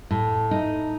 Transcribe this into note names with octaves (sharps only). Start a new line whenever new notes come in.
A2
D#4